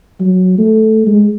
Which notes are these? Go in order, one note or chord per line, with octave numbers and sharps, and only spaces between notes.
F#3
A3
G#3